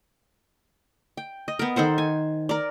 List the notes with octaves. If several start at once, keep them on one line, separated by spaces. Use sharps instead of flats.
G5
D#5
B3 A#4
D#3 A4 C5 F#5
G#5
A#4 D5